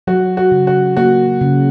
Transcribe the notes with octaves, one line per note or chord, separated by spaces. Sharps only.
F#3 F#4
F#4
C#3
F#4
A#3 F#4
C#3